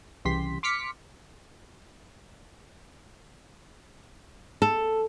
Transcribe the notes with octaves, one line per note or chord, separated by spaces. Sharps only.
C2 C#3 E3 G4 C6 B6
C6 D6 F6 B6 C#7
A4